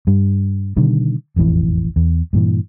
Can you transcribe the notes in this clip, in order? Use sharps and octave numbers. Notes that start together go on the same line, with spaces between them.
G2 G3
B2 D3 D#3 G3
E1 A1 F2 E3
E2
G2 A#2 E3